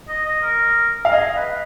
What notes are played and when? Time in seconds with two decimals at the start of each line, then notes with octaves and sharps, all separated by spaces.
0.08 D#5
0.25 D#5
0.43 A#4
1.05 F5
1.11 G#4 D#5
1.36 B4